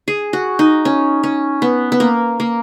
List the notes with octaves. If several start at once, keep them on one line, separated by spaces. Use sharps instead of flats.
G#4
F#4
D#4
C#4
C#4
B3
B3
A#3
A#3